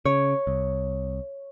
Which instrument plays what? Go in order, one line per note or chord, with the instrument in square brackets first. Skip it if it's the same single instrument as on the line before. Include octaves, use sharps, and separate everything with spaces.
[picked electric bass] C#3 [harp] C#5
[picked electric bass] C2